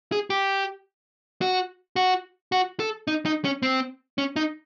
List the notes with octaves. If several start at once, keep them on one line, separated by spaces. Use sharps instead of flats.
G#4
G4
F#4
F#4
F#4
A4
D#4
D#4
C#4
C4
C#4
D#4